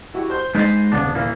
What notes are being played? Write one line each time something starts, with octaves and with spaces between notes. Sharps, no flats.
E4 F#4 G4
C5 G6
G#3 D#4 B4 C5 D#5 A6
D#1 C#3 B3 D4 D5
A#2 E3 A#3